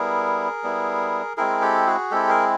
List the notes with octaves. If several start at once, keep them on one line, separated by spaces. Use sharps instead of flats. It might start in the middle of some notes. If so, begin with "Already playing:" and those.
Already playing: G3 B3 E4 G#4 A#4
G3 B3 E4
G#3 C4 E4 G#4 A#4
G4 A4
F#4 G#4
G#3 C4 E4 G4 A4
G#4 A#4